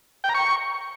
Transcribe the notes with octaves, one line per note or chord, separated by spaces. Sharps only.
G5
A#5
C#6